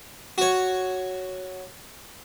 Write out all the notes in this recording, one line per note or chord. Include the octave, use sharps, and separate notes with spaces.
F#4 C#5